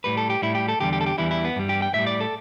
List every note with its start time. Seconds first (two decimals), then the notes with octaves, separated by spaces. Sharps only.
0.04 A2 G3 B4
0.17 A4
0.30 G4
0.42 A2 G3 E4
0.55 G4
0.68 A4
0.81 E2 D3 G3 G4
0.93 G4
1.01 A4
1.06 G4
1.18 E2 E3 G3 E4
1.31 E4
1.45 B3
1.56 G2 G3
1.69 G4
1.82 G5
1.94 A2 G3 E5
2.07 D5
2.20 A4